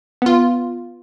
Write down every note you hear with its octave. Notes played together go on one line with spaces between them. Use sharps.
B3 F4